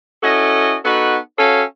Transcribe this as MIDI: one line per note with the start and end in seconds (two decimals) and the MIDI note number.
0.23 0.76 61
0.23 0.76 64
0.23 0.76 66
0.23 0.76 69
0.23 0.76 75
0.85 1.17 59
0.85 1.17 63
0.85 1.17 66
0.85 1.17 69
0.85 1.17 71
1.38 1.63 61
1.38 1.63 66
1.38 1.63 69
1.38 1.63 73
1.38 1.63 77